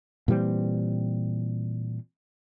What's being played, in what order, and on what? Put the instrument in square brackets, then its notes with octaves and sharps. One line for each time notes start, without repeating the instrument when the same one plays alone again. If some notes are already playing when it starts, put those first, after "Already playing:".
[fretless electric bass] A#2 E3 G3 C4